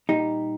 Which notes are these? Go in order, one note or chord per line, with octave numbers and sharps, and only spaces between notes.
A#2 G3 D#4 G4